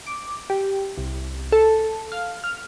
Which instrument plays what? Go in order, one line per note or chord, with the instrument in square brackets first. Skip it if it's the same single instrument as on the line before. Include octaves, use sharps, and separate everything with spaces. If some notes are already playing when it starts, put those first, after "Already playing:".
[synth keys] D6
G4
C2
A4
F5
F6